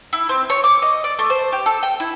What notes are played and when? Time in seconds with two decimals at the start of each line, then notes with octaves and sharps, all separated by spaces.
0.13 E4
0.29 C4
0.50 C#5
0.64 D6
0.82 D#5
1.04 D5
1.19 A3
1.30 C5
1.52 G4
1.66 A4
1.83 G5
2.00 E4